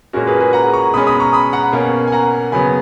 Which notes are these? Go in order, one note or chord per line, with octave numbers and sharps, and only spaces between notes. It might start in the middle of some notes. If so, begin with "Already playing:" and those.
A#2 G#3 C#4 F#4 A#4
G#4 B4
G#4 B4
F#5 A#5
A#5 C#6
B2 G#3 C#4 B5 D#6
B5 D#6
A#5 C#6
B5 D#6
F#5 A#5
B2 A#3 C#4
G#5
F#5 A#5
C#3 F#3 B3 G#5 B5